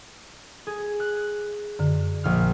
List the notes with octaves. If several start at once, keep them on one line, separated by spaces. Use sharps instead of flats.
G#4
F#6
F#2 D3
A#1 F6